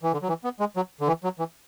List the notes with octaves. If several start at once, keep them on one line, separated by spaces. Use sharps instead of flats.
E3
D3
F#3
E3
B3
G#3
F#3
D3
E3
F#3
E3